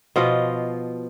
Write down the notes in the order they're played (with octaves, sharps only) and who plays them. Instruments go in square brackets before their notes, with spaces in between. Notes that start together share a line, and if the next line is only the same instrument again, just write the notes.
[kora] B2 F3 F4 D#5